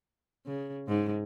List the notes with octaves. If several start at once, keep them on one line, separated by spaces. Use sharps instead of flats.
C#3
G#2